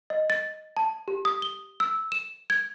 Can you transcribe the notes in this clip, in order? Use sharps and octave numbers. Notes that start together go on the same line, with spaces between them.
D#5
A6
A5
G4
D#6
G7
E6
E7
G#6